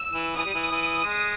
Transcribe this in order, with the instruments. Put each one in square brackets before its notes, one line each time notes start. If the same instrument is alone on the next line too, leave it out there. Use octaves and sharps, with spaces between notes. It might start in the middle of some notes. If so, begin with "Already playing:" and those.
Already playing: [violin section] E6
[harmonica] E3
[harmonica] E3 [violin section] D#6
[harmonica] G3
E3
E3
G#3